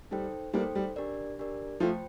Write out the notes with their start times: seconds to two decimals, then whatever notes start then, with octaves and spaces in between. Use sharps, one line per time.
0.11 G3 D#4 A4 C5 G5
0.53 G3 A#3 D#4 A4 C5 G5
0.75 G3
0.96 D4 G4 A#4 D5
1.39 D4 G4 A#4 D5
1.80 F3 A3 F4 C5 G5